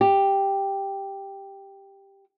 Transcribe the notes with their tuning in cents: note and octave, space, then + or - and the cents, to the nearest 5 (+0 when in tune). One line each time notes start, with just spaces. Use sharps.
G4 +5